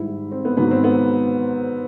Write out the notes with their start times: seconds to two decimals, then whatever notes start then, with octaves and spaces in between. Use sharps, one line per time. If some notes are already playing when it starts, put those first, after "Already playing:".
Already playing: G#2 D#3 G3 E4
0.31 C4
0.45 B3
0.57 G#2 D#3 F#3 B3
0.71 C4
0.84 B3